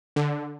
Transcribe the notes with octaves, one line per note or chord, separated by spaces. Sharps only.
D3